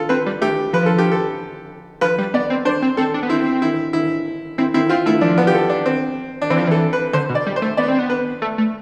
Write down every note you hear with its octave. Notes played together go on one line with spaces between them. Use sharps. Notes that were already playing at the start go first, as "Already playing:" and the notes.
Already playing: F4 A4
C4 B4
G3
A3 G4
F3 B4
A4
G4
A4
F3 B4
G3
B3 D5
C4
D4 C5
C4
C4 A4
D4
B3
C4 E4
E4
E4
C4 E4
C4 E4
C4 F4
A3 E4
F3 D4
B3
G4
A4
D4
C4
D4
E3 C4
F3
E3 A4
B4
D3 C5
B2
D5
G3
C5
A3
B3 D5
C4
B3
B4
A3
A3